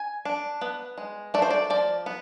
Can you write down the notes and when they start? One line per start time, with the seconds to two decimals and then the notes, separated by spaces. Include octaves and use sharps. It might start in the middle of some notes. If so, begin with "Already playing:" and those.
Already playing: G#5
0.25 D4
0.61 B3
0.98 G#3
1.34 A3 D5
1.42 C5
1.51 D5
1.70 F3 D5
2.06 B3